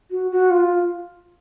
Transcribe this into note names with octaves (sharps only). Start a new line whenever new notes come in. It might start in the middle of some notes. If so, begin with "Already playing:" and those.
F#4
F#4
F4